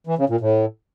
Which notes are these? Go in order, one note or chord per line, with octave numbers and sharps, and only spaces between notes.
E3
C#3
A#2
A2